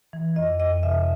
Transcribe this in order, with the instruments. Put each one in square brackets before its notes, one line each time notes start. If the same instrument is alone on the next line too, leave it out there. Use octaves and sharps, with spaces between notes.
[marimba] E3
F2 D#5
F2 D#5
C3 E5